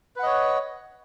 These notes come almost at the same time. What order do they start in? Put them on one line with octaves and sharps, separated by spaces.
B4 F#5 D#5 C#5